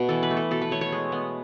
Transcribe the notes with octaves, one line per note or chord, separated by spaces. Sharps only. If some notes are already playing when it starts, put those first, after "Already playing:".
Already playing: B2 A3
E3 A4
B4
A3
A4
B2 A4
B4
A3 C#5
C#5
G#3
B3